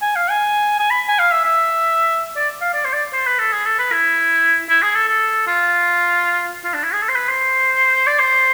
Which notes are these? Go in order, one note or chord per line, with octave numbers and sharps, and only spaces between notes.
G#5
F5
G#5
G#5
B5
G#5
F5
E5
E5
D5
F5
D5
C5
D5
C5
B4
A4
G#4
A4
B4
E4
E4
G#4
A4
A4
F4
F4
D4
E4
G#4
A4
C5
B4
C5
D5
C5